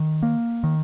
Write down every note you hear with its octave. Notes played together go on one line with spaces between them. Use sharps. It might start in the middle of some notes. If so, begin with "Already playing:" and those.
Already playing: D#3
A#3
D#3